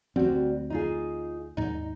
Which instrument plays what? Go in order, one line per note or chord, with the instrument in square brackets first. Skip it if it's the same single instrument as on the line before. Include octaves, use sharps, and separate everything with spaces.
[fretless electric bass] D2 C4 [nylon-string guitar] G3 F#4
[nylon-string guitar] D#4 F4 G#4
[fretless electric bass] D#2 G#2 [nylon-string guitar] D#4